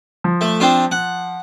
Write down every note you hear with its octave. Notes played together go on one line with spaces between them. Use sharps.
F3
A3
C4 D4 F4
F#5